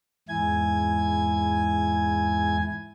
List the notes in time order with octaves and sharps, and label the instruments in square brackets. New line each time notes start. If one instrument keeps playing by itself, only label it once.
[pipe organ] E2 G#2 E4 G#5 G#6